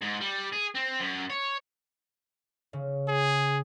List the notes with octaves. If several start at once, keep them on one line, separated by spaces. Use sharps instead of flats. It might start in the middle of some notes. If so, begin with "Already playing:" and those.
G#2
G3
G#4
C4
F#2
C#5
C#3
G#4